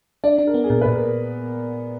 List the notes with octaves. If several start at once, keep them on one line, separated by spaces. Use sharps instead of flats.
D4 D5
D4
A#4
B3
G#4
A#2 A#4
B4
A#2
A#4